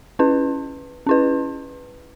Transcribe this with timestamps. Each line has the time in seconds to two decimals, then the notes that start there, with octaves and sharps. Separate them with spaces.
0.19 C#4 E4 B4
1.07 C#4 E4 B4